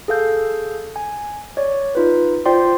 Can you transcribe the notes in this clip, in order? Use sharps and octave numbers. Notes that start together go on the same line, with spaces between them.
G#4 A4 F5 G6
G#5
C#5 D5
D#4 F4 B4
F4 C5 D5 G5 C6